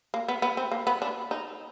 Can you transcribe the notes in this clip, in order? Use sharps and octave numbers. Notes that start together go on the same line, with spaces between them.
A#3
B3
B3
C4
A#3
B3
D4
D#4